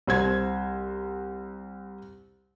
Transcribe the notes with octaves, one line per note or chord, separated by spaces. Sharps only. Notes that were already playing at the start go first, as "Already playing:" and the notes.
C2 C5 G#6